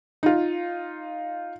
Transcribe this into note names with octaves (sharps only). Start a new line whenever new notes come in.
D#4 F4